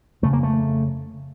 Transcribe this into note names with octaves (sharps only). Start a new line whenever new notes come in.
F2 C#3 A3
A#3
A3